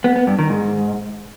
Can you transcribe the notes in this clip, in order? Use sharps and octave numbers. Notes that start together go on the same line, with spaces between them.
B3
B3
G2
D#3
G#2